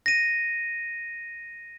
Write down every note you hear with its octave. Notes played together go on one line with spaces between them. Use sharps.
A#6 D#7